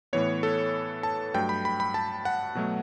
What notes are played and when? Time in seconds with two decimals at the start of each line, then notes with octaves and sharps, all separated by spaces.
0.13 A2 E3 B3 C#5
0.43 A4
1.03 A5
1.34 G2 F#3 A3 G5
1.49 B5
1.65 B5
1.80 B5
1.94 A5
2.25 F#5
2.55 B2 F#3 A3